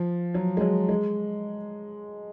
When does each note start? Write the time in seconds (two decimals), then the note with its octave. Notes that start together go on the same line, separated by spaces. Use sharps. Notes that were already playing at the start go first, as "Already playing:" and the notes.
Already playing: F3
0.34 F#3
0.57 G#3
0.61 F#3
0.89 G#3